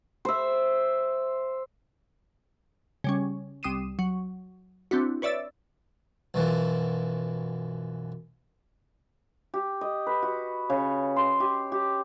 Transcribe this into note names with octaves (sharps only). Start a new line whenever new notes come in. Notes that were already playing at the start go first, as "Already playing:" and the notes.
C5 E5
C#3 G3 C#4
C2 G3 D#6 C7 D#7 E7
F#3
C4 D4 E4 F#4
B4 C#5 D5 E5 E6 A6
B1 F#2 E3 F3
G4
D#5
B4
F#4
C#3
C6
G4
G4